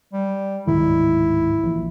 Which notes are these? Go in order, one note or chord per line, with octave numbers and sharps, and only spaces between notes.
G3
D1 G#2 D#3 E4
A#1 E3